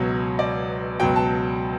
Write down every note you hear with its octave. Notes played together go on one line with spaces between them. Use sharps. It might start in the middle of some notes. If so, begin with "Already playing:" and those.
Already playing: C#2 B2 F#3 C#5
D5
C#2 B2 F#3 G5
A5